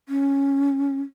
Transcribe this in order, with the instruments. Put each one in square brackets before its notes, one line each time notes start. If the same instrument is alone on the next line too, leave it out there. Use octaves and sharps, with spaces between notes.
[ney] C#4